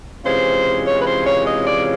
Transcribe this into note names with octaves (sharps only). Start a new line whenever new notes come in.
C3 E3 G#3 C#4 F4 C5
C#5
B4
C5
C#5
D#5
D5